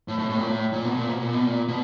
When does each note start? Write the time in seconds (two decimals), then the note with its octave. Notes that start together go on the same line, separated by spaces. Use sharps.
0.08 A2
0.18 A2
0.30 A2
0.39 A#2
0.47 A2
0.73 A#2
0.85 B2
0.97 A#2
1.09 B2
1.21 A#2
1.33 B2
1.46 A#2
1.68 B2